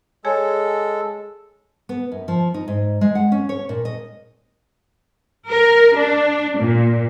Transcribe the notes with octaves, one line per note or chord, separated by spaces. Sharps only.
G#3 G#4 A4 C#5 G#5
B3
F#2
F3
D#4
G#2
G#3
F#5
C#4
C#5
A#2
D#5
A#4
D4
A#2